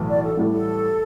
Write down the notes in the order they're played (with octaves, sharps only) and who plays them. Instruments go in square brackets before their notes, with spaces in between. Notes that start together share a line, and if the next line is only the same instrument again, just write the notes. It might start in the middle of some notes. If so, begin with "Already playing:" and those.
Already playing: [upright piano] B1 A2 E3
[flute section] D5
A4
[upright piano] A1 A2 G3
[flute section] A4